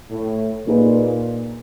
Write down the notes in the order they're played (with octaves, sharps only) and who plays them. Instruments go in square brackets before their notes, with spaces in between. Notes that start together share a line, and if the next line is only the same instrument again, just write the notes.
[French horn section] A2
[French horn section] A#2 [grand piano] A#3 D#4 G#4 B4